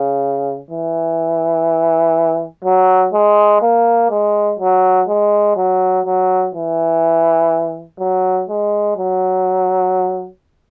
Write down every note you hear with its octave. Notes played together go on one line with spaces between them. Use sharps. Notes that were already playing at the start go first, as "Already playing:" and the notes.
Already playing: C#3
E3
F#3
G#3
A#3
G#3
F#3
G#3
F#3
F#3
E3
F#3
G#3
F#3